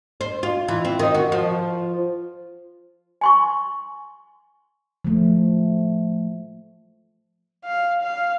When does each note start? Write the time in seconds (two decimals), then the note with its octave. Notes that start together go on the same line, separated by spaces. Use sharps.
0.21 C5
0.43 F4
0.68 E3
0.85 C4
0.99 D#3
1.15 F#4
1.32 F3
3.21 G#5 C6 C#6
5.05 F3 A3
7.65 F5
8.02 F5